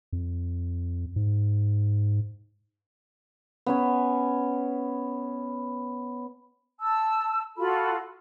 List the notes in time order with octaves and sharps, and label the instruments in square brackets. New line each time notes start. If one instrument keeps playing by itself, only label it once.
[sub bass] F2
G#2
[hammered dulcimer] B3 C#4 C#5
[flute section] A5 E6
F4 F#4 A4 B5